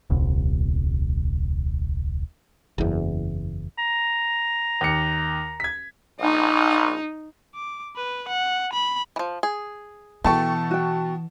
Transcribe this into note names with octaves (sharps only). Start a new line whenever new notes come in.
D#1 C2
F#1 E2
A#5
D#2 C#7
G#6 B6
A#1 D#4
D6
B4
F#5
B5
E3 F3
G#4
B2 E3 A3 A4 G5 A5 C#6
F#4 G5